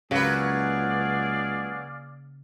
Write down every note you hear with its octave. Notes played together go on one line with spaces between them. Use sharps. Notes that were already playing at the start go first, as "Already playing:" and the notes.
C#2 C#3 F#3 A#3 G#4 B4 D5 F5